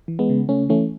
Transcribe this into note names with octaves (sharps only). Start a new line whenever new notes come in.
E3
G#3 B3
C#3
C#3 A3 C#4
E3 A3 C#4